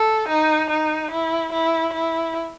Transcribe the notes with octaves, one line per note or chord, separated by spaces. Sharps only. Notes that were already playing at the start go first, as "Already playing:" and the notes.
Already playing: A4
D#4
D#4
E4
E4
E4